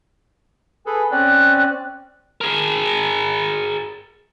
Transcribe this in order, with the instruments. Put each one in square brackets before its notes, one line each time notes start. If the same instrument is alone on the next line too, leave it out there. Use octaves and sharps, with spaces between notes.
[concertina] G#4 A4 B4 [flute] G#5
[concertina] C4 C#4 D5 [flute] F#6
[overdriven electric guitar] G#4 A#4